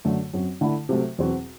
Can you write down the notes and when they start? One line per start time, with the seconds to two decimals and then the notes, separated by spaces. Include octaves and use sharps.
0.05 F#2 D3 A3
0.34 F#2 F#3 C4 F#4
0.61 D3 A3 E4
0.89 C3 F#3 A3
1.18 E2 B2 F#3 C4 F#4